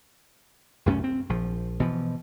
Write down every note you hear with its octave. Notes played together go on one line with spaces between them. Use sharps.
C2 F#2 A3 C#4
C4
A#1 F3
B2 E3 F3